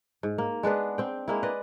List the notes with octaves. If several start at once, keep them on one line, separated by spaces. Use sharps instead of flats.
G#2
A#3
G#3 B3 D4 B4
C4 G5
G#3 A#3 E4
B4 D5 D#5